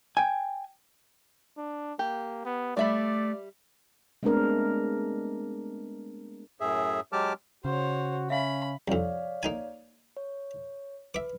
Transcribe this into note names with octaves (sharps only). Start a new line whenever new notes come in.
G5 G#5
D4
A#3 G4
B3
G3 A3 D5 E5 B5
G#3 A3 B3 C4 D4 A#4
F#2 A2 G#4 E5
F#3 G#3 G4 A5 D6 F6
C#3 F#4 C5 C#5
C#4 E5 F5 B5
C2 F2 C#5 D5 F5
A#3 D#4 G#5
C#5
B4 E5 D6